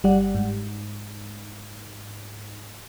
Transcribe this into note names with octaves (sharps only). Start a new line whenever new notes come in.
G1 G3 G4 D5 F#5
G#2